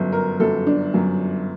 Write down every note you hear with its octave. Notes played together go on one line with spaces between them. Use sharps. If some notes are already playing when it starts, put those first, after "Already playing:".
Already playing: G1 F#2 F#3
A#4
G1 F#2 F#3 A4
D4
G1 F#2 F#3